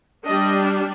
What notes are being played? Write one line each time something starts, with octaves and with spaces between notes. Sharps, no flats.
G3 D4 D#5